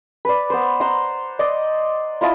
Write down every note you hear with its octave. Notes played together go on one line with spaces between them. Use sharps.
B4 D5
B3 C5
C5 F#5 A#5 C6
D5 D#5 C6
E4 F4 D#5 A5